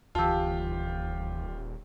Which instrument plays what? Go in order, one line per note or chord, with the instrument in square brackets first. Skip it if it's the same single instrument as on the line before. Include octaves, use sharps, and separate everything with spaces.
[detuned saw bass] D#1 [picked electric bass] D2 E3 [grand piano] F4 G4 [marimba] A5 E6